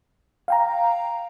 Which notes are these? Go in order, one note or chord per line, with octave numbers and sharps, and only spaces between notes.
F5 G5 A#5